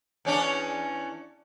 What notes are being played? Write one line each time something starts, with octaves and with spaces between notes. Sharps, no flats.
E2 C#4 D4